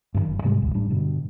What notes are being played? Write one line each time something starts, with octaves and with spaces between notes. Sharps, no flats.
G2 C3 D#3
F#1
G#2 C3 G3 G#3
D#1 G#1 D2
A2 G3 D4
G2 B2 D3